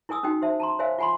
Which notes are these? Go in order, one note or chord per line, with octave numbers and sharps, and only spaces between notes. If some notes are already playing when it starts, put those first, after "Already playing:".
E4 A#4 G#5 D#6 E6
C#4 D#4 F#4 G5
F#4 C5 E5 A5
A5 A#5 C6
A#4 C5 C#5 E5 F5 G#5
F4 F#5 G#5 B5 C6